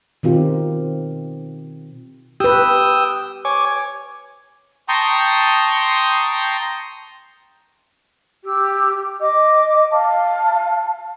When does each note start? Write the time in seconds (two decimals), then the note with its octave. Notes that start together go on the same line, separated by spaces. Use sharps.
0.23 B2 D#3 C4 F4 G4
2.40 G4 B4 G5 D#6 E6
3.45 C#5 G#5 D6
4.89 G5 A5 A#5 C6 C#6 D#6
8.45 G4 E6
9.20 D#5 D6
9.91 F5 A5